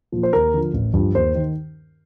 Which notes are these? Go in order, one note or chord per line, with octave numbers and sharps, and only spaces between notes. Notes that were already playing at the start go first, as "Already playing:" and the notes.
A#2 F3
C5
D#2 A#4
D3 F3
A1
G2 F3
D#2 C5
D#3